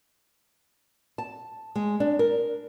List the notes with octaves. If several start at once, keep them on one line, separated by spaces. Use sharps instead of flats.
A5
G#3
D4
A#4